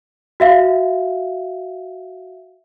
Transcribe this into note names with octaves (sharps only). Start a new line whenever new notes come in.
F#4 E5 F5